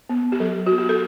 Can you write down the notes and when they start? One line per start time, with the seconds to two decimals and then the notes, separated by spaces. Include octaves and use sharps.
0.10 B3
0.32 G4
0.40 F#3 A4
0.66 B3 F#4
0.78 G4
0.89 A4